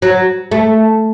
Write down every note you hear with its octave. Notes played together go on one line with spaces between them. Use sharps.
F#3
A3